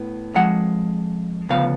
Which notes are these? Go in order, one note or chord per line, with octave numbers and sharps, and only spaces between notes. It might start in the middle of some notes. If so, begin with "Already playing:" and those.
Already playing: A2 B3
F2 F3 G#3 F#5
D2 C#3 F3 B3 F5